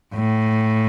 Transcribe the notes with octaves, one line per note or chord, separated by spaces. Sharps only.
A2